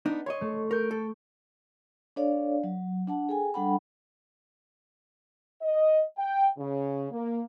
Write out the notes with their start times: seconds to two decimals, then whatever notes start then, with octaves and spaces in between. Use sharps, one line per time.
0.06 B3 D4 D#4
0.26 C#5 D#5 C6 C#6
0.41 A3
0.71 A#4 C#6 G6 D7
0.91 A4
2.16 D4 A4 C#5 D5 F5
2.64 F#3
3.07 D4 F#5 A5
3.29 G#4 A4 G5 G#5
3.54 G3 D4 A4 F#5 G5 B5
5.62 D#5
6.18 G5
6.58 C#3
7.12 A#3